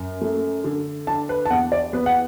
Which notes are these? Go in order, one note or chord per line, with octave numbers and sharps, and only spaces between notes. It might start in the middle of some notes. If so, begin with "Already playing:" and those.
Already playing: F#2
A3
D3
D4 A5
B4
A5
E2 F#5
D5
B3 B4
F#5